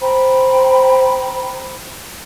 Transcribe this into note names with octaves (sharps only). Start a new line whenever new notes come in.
C5 G5 A#5 B5